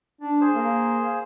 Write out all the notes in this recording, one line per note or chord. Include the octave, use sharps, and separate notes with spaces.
D4
G#4 C5
A#3